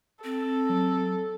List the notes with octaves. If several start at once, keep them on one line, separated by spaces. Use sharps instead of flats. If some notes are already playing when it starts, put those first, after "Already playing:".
C4 A4
F#3